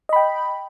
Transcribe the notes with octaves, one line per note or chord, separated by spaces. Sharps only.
D#5 G5 B5